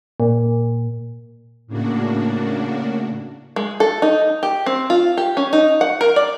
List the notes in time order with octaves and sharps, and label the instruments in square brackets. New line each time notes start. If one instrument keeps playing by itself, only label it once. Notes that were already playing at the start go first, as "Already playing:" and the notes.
[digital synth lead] A#2
[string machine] A2 C#3 A#3 D4 F#4
[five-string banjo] G#3
A4
D#4
G4
C4
F4
G4
C#4
D#4
F#5
A#4
D5